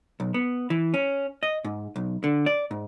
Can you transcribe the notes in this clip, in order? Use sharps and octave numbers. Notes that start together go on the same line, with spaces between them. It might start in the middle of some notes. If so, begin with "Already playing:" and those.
B1
B3
E3
C#4
D#5
G#2
B1
D3
D5
G#2